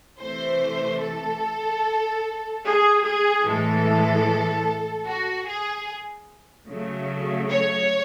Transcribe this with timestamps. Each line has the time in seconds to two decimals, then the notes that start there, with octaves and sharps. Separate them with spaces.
0.21 C3 E3 A3 C5
1.01 A4
2.64 G#4
3.04 G#4
3.45 A2 E3 G#3 A4
5.07 F#4
5.47 G#4
6.68 C#3 F#3 A3
7.49 C#5